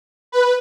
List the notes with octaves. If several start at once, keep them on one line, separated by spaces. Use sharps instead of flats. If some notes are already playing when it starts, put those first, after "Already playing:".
B4